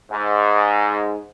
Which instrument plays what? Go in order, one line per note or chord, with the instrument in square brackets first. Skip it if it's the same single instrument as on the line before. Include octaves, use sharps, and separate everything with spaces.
[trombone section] G#2